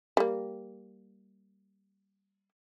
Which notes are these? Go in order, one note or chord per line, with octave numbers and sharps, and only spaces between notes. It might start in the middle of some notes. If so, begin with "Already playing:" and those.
G3 A#3